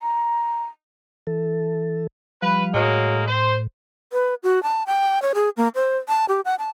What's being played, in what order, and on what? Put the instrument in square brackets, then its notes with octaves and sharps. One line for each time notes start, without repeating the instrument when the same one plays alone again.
[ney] A#5
[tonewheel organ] E3 A4
[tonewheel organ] F3 G3 F5 [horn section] B4
[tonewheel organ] A2 [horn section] F#3 G#3 A#3
[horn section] C5
[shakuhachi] B4
F#4
A5
G5
C#5
G#4
A#3
C5
A5
G4
F#5
A5